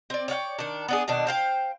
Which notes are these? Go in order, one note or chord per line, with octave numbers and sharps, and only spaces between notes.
C4 D5
C#5 D5 F5 G5
D#3 D4
B3 D4 G#4
B2 D#3 D4
C5 F5 G5